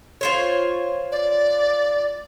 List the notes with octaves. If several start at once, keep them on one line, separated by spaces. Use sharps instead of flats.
F4 C5 C#5
D5